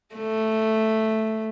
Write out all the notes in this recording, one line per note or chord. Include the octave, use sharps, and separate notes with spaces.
A3